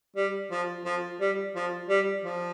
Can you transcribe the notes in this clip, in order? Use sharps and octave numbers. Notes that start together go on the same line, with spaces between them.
G3
F3
F3
G3
F3
G3
F3